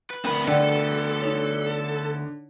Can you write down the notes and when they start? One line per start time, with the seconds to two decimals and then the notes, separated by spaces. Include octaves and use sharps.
0.10 B4
0.25 D2 B3 C4 A#4 B5
0.48 D3 A4 D5 F#5 G5
1.21 D4 D#4 C#5